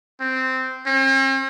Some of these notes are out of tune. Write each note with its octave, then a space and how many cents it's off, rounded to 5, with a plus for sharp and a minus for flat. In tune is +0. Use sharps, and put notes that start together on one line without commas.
C4 -10
C4 +45